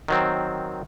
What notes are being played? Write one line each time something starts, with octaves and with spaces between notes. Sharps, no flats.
D#3 F#3 C4